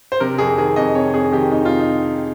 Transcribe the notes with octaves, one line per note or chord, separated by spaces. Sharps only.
C5
C3 A#4
F2 G#4
D#3 G#4
F2 D#5
C3 C#5
F2 G#4
D#3 G4
F2 D#4
C3 F4
D#4